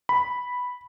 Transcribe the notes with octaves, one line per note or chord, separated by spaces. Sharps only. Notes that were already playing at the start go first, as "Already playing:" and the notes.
B5